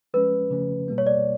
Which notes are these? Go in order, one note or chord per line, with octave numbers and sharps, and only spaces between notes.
F3 G#3 C#4 B4
C#3 F3 A3 C#4
B2 G3 A#3
C#5
D5